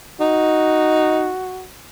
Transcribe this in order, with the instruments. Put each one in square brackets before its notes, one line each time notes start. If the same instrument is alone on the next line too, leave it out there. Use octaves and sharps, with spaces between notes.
[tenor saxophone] D#4 [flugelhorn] F#4